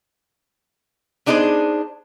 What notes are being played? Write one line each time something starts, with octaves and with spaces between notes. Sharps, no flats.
B3 D4 D#4 G#4 A#4 C5